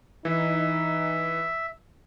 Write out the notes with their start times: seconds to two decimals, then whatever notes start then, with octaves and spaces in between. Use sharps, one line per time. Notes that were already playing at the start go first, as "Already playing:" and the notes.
0.25 E3 D#4 E5